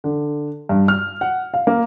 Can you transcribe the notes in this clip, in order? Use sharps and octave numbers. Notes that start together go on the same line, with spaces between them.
D3
G2
F6
F#5
F5
A#3